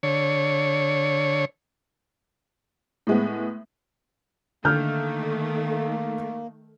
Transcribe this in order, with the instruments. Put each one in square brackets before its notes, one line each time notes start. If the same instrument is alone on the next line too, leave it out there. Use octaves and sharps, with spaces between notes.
[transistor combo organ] D3 C#5
[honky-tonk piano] A2 G#3 B3
[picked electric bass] D3 [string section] D#3 A3 [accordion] A#3 [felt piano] F6 G6